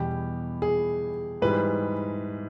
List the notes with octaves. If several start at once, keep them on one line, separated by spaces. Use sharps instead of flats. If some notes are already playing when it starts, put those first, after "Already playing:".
Already playing: E2 B2 G3 G4
G#4
G#2 E3 G3 B4